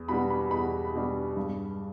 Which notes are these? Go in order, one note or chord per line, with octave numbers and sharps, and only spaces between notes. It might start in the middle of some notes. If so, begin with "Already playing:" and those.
Already playing: E2
B2 G3 B3 D4 B5
B5
E2 B5
B2 G3 B3 D4
G2